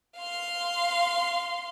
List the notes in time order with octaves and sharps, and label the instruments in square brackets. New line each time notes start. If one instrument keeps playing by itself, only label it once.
[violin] F5 C6